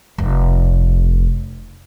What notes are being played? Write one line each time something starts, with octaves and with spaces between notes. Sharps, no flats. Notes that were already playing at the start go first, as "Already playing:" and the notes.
F1 C#3